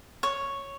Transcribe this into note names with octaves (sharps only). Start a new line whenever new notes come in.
C#5